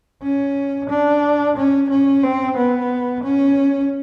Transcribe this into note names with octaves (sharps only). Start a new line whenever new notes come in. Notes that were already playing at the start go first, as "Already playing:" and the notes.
C#4
D4
C#4
C#4
C4
B3
C#4